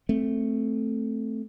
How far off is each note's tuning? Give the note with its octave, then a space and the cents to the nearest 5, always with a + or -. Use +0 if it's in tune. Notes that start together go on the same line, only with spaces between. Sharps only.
A3 +0 C4 +0